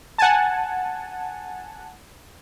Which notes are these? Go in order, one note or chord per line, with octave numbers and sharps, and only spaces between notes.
F#5 G#5 A5